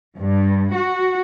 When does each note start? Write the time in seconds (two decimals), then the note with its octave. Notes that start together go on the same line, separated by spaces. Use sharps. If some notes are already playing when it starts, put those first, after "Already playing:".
0.18 G2
0.74 F#4